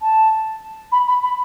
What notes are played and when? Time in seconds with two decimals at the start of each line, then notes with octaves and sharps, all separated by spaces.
0.01 A5
0.91 B5
1.07 B5
1.22 B5